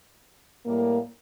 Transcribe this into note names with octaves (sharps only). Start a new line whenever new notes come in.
A2 G3 A#3